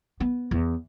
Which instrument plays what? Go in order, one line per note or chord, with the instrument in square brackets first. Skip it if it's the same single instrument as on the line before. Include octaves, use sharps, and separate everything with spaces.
[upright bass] B3
E2